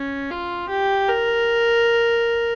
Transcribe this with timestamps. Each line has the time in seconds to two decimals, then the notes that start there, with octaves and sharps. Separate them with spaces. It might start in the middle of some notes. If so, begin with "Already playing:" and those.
Already playing: C#4
0.31 F4
0.70 G4
1.09 A#4